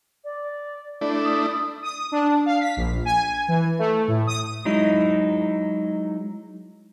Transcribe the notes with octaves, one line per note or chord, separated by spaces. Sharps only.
D5
A3 D4 E4 D5
D#6
D#6
D4
F5
B6
A#1
G#5
E3
A3
A2
D#6
F#3 G#3 D#4 E4